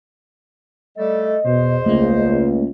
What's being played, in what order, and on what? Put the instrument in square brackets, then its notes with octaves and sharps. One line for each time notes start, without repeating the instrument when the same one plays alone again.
[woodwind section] G3 A3 A4 [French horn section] D#5
[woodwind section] E2 C5 [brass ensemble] B2
[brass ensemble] C#2 [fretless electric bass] A3 A#3